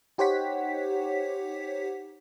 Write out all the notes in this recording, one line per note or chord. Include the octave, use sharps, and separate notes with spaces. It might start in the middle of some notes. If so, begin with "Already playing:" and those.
D#4 G4 C5 C#5 F#5 B6